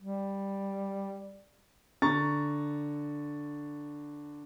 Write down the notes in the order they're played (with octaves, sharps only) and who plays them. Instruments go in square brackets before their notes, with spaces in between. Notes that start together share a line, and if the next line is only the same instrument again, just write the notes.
[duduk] G3
[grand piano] D3 A#5 C#6 A6